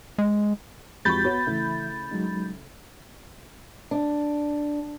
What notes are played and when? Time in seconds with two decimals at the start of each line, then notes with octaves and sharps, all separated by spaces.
0.18 G#3
1.05 F2 G#3 F#4 G4 B5 C#6 G6 A6
1.25 B3 F#4 B4 C#5
1.47 C#3 E3 A3 E4 E5
2.11 F#3 G#3 D#4
3.91 D4